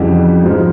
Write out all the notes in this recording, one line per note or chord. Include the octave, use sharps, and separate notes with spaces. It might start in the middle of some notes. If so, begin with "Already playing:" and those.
Already playing: F2 C#3 E3 G3 F#4
G#2 F3 G#3